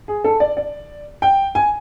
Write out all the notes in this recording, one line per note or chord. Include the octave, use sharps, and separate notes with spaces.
G#4
A4
D5
D5
G5
G#5